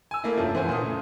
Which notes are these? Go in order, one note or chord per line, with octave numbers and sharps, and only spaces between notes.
G#5 E6
A3 A#3 E4
F1 G2 F3 A3 C#4 A5
E3 A3 C5 F#5 G#5
A#2 D#6
C#3 A3